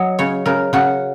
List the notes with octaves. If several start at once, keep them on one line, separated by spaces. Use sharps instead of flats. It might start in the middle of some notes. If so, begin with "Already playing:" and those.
Already playing: F#3 D#5
C#3 C#5
C#3 A#4
C#3 F#4